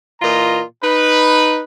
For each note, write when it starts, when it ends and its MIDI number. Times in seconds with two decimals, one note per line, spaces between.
0.21 0.62 46
0.21 0.62 52
0.21 0.62 65
0.21 0.62 75
0.21 0.62 82
0.83 1.61 63
0.83 1.61 71